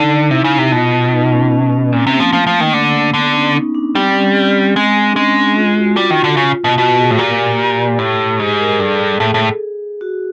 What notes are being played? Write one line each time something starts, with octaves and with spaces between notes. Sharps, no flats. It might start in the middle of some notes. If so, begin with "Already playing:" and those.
Already playing: D3 D#4
C3 E4
C#3
C3
B2 F4
D#4
C#4
C#4
C#4
A#2 C4
C3
A#3
F3
F3 A3
F3
A#3
D#3
D3
D3 B3
C#4
D#4
D4
G3 C4
C#4
C4
G#3
D4
G#3 C#4
D4
F4
F#4
G3 F4
D#3
D3
C#3
B2
B2 F#4
G#4
A2
A#2 G4
G4
G4
A2
G#2 G#4
A#4
G#4
G2 A4
A4
G#4
A2
A2
F#4